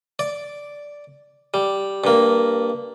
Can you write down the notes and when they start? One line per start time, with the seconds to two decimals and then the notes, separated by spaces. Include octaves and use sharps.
0.19 D5
1.54 G3
2.04 G2 A#3